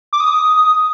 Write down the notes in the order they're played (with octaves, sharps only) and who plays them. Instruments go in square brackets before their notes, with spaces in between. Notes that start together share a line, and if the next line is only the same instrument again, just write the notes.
[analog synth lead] D6
D#6